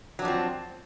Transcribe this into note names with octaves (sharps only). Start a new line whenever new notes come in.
F3 F#3 C4 D4